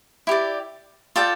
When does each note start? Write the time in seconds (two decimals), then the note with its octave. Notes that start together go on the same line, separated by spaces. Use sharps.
0.27 E4 G4 D5
1.16 F4 A4 D5 G5